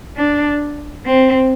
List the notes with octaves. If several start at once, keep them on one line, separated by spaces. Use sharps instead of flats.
D4
C4